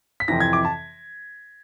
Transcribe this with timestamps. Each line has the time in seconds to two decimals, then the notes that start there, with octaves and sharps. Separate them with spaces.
0.20 B6
0.28 F2 C3 E3 A#6
0.40 G#6
0.53 D6
0.65 A5